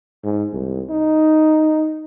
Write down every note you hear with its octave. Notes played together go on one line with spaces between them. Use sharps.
G#2
C2
D#4